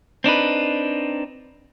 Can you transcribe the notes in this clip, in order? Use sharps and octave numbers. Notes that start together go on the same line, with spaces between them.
C4 D4 D#4 B4